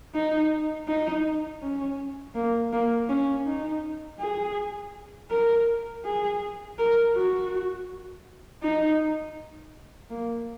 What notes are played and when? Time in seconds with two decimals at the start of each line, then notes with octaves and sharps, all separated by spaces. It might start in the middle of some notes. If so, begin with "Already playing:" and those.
0.14 D#4
0.88 D#4
1.62 C#4
2.35 A#3
2.73 A#3
3.09 C#4
3.46 D#4
4.19 G#4
5.31 A#4
6.05 G#4
6.79 A#4
7.14 F#4
8.63 D#4
10.10 A#3